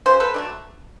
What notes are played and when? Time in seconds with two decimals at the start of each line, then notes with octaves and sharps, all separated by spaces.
0.06 C#3 F#3 C5
0.20 A4 B4
0.34 F#3 A3 D4